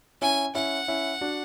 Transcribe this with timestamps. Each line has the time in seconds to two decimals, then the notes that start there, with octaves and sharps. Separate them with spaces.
0.22 C#4 E4 G#5
0.55 C#4 E4 F#5
0.88 C#4 E4
1.21 D4 F#4